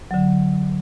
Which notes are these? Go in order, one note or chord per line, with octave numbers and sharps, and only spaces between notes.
D3 F#3